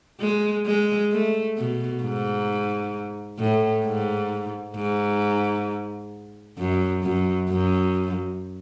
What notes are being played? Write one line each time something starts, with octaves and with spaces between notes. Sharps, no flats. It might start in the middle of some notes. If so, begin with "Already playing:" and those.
G#3
G#3
A3
B2
G#2
A2
G#2
G#2
F#2
F#2
F#2